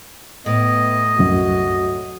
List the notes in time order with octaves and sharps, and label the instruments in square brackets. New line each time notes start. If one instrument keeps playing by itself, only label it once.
[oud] A2 [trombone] B3 [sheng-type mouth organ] D#5
[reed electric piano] C2 F#2 [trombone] F#4